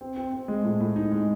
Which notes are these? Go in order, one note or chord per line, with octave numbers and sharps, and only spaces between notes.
C4
C4
C4
G#3
A2
A2
D#4
G#3